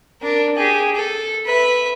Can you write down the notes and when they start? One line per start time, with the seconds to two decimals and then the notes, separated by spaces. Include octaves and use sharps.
0.21 D4 A#4
0.56 G4 G#4
0.95 A4
1.46 B4 E5